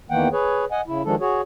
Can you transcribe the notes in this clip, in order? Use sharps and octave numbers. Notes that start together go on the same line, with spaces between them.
E2 D#3 E3 A#3 F#5 G5
G#4 B4 C#5
D#5 F#5 G#5
C#3 E4
D#3 F3 G#3 D4 A4
F#4 G#4 C#5